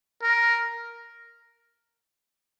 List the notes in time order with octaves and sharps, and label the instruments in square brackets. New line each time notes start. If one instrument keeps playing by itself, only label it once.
[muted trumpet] A#4